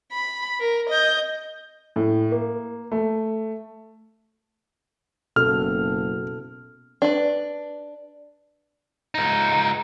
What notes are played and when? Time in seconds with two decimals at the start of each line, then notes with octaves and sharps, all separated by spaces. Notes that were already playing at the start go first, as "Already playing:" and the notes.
0.13 B5
0.60 A#4
0.89 D#5 G6
1.96 A2
2.32 A#3
2.92 A3
5.36 F#1 B2 A4 F6
7.02 D4 B4
9.15 C#2 D#4